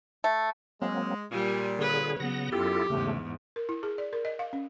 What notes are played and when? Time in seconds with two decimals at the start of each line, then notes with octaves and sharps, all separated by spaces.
0.24 A3
0.82 F#3 G#3 A#3 C4
1.32 A#2 G3 G#5
1.79 D3 G#4 B4 C#5
2.20 C#3 F#3 B3 F#5 A#6
2.52 F#2 E4 F4 G4 A4
2.90 E2 G#2 C#3 A3
3.56 A#4
3.69 E4
3.83 G#4
3.98 D5
4.13 A#4
4.25 D#5
4.39 F5
4.53 C#4